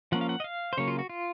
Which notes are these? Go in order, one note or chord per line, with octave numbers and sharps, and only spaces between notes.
F3 A#3 C#4 F#5
F5
F#5
D#5
F5
C5
C#3 F#3 A#3 C#5
F4
F#4
F4